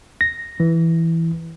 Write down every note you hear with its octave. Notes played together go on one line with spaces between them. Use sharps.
A#6
E3